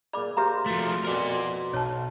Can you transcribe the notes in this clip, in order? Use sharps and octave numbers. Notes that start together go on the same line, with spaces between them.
A#2 G#4 D5 B5 D6
A#3 G4 A#4 C5 E5 A#5
F3 A3 F#4 C6
F2 B2 A#4 D5
B1 C#5 A5